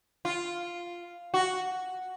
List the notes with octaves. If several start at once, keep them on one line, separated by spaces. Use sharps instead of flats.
F4
F#4